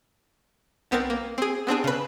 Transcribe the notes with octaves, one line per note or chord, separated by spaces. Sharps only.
B1 B3 C4 A#4 A6
A#3
C4 G#4
B3 C4 D4 G#4
C#3 B4